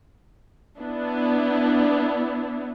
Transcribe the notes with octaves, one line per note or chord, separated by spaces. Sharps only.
B3 D4 E4